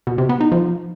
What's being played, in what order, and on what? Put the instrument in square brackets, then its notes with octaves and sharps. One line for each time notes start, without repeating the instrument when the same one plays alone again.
[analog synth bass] B2
C3
B3
D#4
F3